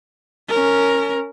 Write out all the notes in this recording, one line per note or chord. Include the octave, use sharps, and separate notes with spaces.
C#4 A#4